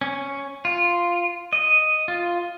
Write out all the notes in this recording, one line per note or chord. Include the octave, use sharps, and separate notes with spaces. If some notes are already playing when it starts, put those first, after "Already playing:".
C#4
F4
D#5
F4